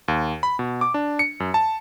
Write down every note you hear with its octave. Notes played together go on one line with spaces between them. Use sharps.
D#2
B5
B2
D6
D4
C#7
F#2
A5